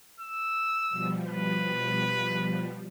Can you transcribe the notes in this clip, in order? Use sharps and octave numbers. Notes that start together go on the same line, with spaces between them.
E6
B2 F3 G3
B4